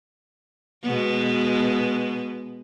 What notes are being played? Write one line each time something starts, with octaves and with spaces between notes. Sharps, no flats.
B2 G#3 B3